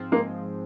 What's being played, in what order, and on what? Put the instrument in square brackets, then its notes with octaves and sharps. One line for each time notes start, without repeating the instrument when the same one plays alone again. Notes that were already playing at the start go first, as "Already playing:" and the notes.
Already playing: [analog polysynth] G#2 F3 C4
[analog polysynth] G#3 [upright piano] A#3